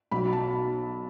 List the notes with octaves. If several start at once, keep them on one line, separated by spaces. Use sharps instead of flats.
B1 B2 F#3 B5
A5